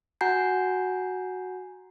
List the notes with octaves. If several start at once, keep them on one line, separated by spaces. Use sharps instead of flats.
F#4 F#5 G#5 A#5 G6 C7